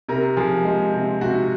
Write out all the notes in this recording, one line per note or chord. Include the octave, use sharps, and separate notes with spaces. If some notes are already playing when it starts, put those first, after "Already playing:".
C3 A#4
F3 G#4
G#3
C3
C3 F#4